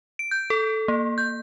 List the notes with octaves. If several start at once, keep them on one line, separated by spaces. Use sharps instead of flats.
D7
G6
A4
A#3
G6